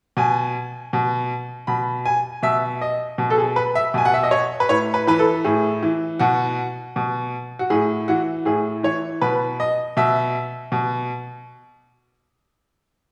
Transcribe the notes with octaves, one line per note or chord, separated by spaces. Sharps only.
B2 G#5
B2
B2 B5
G#5
B2 E5
D#5
B2
A4
G#4
B4
E5
B2 G#5
F#5
E5
D#5
C#5
B4
A2 C#5
B4
E3 B4
A4
A2 G#4
E3
B2 F#4
B2
F#4
A2 G#4
E3 F#4
A2 G#4
E3 C#5
B2 B4
D#5
B2 E5
B2